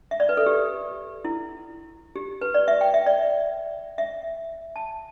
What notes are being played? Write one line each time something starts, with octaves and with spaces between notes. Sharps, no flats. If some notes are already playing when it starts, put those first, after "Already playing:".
E5
D5
B4
A4
G4
E4
G4
B4
D5
E5
G5
E5
D5
E5
A5